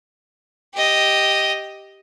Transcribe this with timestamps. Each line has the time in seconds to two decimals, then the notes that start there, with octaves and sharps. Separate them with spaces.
0.74 G4 D#5